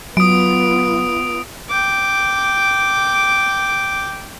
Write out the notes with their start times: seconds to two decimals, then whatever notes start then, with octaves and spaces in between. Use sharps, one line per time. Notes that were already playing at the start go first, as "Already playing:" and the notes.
0.17 F#3 B3 F4 D#6 D7
1.69 G5 D6